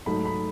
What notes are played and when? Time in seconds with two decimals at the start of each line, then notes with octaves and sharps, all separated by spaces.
0.06 G#2 F#3 A3 D#4 B5
0.25 B5